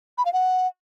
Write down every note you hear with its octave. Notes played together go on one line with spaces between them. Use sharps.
B5
F5
F#5